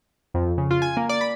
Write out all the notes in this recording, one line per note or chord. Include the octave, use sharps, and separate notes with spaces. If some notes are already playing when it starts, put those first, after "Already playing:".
F2
C#3
F4
G#5
A#3
D5
B5